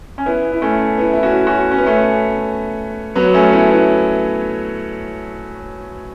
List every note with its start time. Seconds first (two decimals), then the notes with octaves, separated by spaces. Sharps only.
0.18 C#4
0.26 B3 E4
0.52 E4
0.62 A3 C#4
0.98 B3 E4
1.13 E4
1.23 C#4 F#4
1.47 C#4 F#4
1.71 C#4
1.78 B3
1.86 A3 C#4
3.15 F#3 B3
3.34 A3 C#4
3.52 B3 E4
3.71 B3 E4